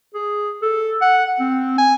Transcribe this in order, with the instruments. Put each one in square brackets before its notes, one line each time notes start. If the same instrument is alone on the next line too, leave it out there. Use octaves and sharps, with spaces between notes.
[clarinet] G#4
A4
F#5
C4
G#5